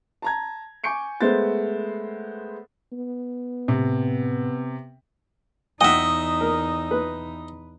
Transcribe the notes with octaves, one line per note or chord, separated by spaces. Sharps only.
A5 A#5 G#6
G#5 C#6 D6 G6 C#7 D7
G#3 A3 B3 C5 A6
B3
A2 C3
E2 D#4 D#5 E5 F#5 G5
A#4
B4